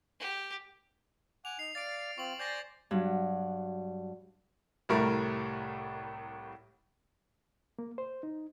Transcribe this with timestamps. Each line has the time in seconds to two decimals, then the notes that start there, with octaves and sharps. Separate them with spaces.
0.20 G4
1.45 F#5 G#5 D6 F7
1.59 D#4 C7 F7
1.75 D5 F5 A6 D7
2.18 C4 F4 C#6 F#7
2.40 C5 D5 G#5 G6 A6 A#6
2.91 G2 F#3
4.89 C2 A2 G3 A3 A#4
7.79 A#3
7.98 C5
8.23 D#4